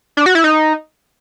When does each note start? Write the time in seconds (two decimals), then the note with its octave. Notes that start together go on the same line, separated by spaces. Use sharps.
0.17 D4
0.26 F#4
0.35 E4
0.44 D#4